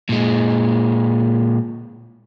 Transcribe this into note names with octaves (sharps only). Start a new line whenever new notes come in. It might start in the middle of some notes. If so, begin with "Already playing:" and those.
A#2 G#3